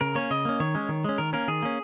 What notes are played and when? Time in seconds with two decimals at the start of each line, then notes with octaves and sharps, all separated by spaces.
0.01 C#3 A#4
0.15 A#3 C#4 C#5
0.30 C#3 D#5
0.45 A#3 C#4
0.60 D#3 C#5
0.75 G#3 C#4
0.89 D#3
1.04 G#3 C#4
1.18 D#3 A#4
1.33 A#3 C#4 A#4
1.48 D#3 G#4
1.62 A#3 C#4